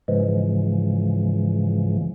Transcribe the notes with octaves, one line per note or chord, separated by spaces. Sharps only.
G#2 C#3 E3 F3 G#3